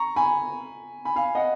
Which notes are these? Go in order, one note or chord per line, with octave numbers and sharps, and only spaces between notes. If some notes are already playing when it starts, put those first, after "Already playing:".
Already playing: A#5 C#6
G#5 B5
G#5 B5
F5 G#5
D#5 F#5